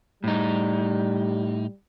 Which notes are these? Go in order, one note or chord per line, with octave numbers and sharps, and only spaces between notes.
A2 G3 D#4